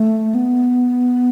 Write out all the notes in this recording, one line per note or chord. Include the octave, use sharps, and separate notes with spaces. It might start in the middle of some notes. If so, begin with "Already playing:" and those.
Already playing: A3
B3